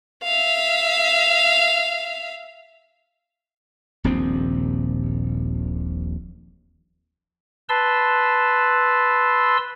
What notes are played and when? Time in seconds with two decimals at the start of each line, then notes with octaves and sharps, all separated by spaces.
0.23 E5 F5
4.04 D#1 A#1 D#2 C4
7.69 B4 A5 C6 E6